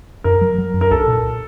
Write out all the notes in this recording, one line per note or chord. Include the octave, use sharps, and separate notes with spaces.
F#2 A#4
F#3
F#3
F#2
A#4
C2 A4
A#2